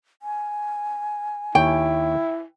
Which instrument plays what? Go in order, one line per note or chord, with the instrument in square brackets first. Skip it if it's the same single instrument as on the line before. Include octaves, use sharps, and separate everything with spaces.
[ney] G#5
[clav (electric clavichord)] D#2 C#5 [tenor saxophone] E4 [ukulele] G5